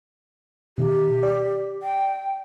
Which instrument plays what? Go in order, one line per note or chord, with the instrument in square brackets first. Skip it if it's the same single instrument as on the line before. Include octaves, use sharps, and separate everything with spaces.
[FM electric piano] B2 D#3 [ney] G4
[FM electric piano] D5
[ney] G5